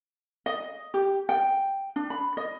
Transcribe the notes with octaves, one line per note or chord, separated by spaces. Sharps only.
D#5
G4
G5
D4
B5
D#5